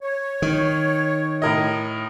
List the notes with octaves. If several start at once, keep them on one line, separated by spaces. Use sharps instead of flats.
C#5
D#3
A2 A#4 D#5